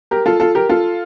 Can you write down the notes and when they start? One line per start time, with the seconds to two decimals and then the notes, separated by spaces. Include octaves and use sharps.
0.11 G4 A#4
0.26 F4 A4
0.40 F4 A4
0.55 G4 A#4
0.69 F4 A4